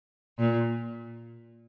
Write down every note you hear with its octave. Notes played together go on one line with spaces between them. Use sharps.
A#2